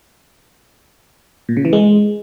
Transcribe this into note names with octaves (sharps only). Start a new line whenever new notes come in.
A#2
C#3
E3
G#3